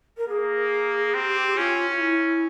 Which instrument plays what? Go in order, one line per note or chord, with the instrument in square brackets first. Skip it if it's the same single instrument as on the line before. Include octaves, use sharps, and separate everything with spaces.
[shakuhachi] A#4
[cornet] A#3 [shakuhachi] G#4
[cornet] C4 [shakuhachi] G4
[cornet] C#4 [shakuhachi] F4
[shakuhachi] F4
E4